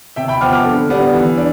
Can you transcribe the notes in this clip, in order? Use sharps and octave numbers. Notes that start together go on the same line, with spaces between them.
C3 E5 G5
G5 B5
F3 B3 D6 F6
D6 F6
D3
G3 B3 D4
E3
D4